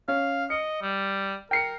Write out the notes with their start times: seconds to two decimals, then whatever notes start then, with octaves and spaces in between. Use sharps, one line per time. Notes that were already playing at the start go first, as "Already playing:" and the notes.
0.08 C#4 F5
0.50 D#5 C#7
0.82 G3
1.51 A#4 G5 C7 C#7